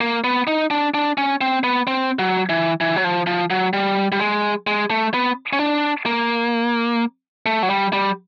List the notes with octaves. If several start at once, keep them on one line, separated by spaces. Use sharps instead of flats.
A#3
B3
D#4
D4
D4
C#4
C4
B3
C4
F#3
E3
E3
F#3
F3
F3
F#3
G3
G3
G#3
G#3
A3
B3
C#4
D4
A#3
A3
F#3
G3
G3